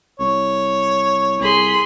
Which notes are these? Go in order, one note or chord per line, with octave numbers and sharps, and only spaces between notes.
C2 C#5
C2 G#4 B5 C6